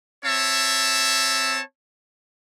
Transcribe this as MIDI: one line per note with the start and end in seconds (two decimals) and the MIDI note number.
0.24 1.60 60
0.24 1.60 73
0.24 1.60 76
0.24 1.60 81